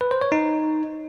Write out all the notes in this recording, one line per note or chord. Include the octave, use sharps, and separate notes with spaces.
B4
C5
C#5
D#4